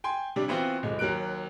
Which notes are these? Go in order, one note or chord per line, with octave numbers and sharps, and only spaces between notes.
G5 G#5 C6
C3 G3 D4
E3 B3 C4 F4 F#4
D1 A1 G#3
D#2 F#3 A#4 F#6 D7